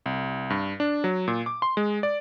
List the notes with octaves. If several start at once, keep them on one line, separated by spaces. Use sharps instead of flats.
C2
G2
D4
F#3
A#2
D6
C6
G#3
D5